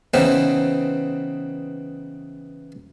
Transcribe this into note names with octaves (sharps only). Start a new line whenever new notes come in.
C#3 E3 B3 C4 D#4